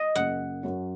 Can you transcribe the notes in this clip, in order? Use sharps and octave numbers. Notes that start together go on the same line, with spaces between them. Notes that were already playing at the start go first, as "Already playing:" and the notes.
Already playing: D#5
F#2 C#3 A#3 F#5
F#2 F#3 C#4